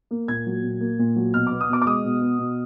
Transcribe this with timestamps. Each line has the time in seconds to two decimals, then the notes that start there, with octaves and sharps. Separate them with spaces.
0.11 A#3
0.28 A#2 G#6
0.47 F#3
0.64 A#2
0.80 A#3
0.99 A#2
1.16 F#3
1.33 B2 F6
1.47 B3 D6
1.61 D#6
1.69 B2 D6
1.82 D6
1.86 G#3 D#6
2.04 B2
2.21 B3
2.39 B2